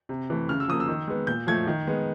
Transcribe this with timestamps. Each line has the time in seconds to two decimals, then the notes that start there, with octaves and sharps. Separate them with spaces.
0.09 C3
0.30 E3 A3
0.49 C#3 F6
0.60 E6
0.68 F3 A#3 D#6
0.80 E6
0.88 D#3
1.08 G#3 B3
1.27 A#2 G6
1.47 F3 A3 G#6
1.67 D#3
1.87 G#3 B3